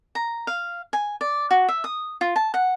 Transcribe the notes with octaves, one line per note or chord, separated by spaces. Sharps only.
A#5
F5
G#5
D5
F#4
E5
D#6
F4
A5
F#5